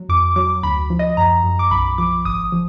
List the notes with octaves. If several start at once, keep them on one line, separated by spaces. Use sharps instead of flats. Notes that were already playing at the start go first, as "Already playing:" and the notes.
Already playing: F#3
F2 D6
F#3 D6
D2 B5
F3
D#5
F#2 A#5
F#2
D6
B1 B5
F3 D6
G#1 D#6
F3